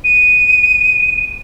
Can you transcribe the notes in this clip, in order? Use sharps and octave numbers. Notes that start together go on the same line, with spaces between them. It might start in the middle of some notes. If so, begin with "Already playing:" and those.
D#7